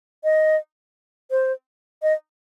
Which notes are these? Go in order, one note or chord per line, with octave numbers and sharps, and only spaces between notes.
D#5
C5
D#5